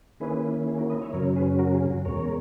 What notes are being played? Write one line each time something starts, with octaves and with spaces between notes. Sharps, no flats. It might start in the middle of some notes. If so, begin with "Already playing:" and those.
D#3 A#3 C#4 E4 G#4 B4
G#4
F#4 A#4
B4 D#5
C#5 E5
F#2 C#3 F#3 C#4 A#4 C#5
G#4 B4
F#4 A#4
G#4
F#4
E2 B2 G#3 A#4 C#5